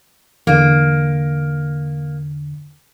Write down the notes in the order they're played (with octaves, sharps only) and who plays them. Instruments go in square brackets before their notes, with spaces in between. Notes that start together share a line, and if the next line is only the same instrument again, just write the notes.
[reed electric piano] E2 D3 [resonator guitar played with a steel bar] A#3